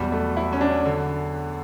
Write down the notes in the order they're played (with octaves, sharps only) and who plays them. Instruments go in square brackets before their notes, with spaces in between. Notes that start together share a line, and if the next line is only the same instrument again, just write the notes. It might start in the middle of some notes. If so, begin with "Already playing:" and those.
Already playing: [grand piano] E2 B2 F#3 [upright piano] G3
[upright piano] A3
E4
C#4
D4
D3